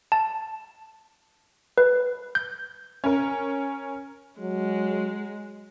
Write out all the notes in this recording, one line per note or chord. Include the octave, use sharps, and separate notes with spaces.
A5
B4
G6
C#4 A#4
F#3 G#3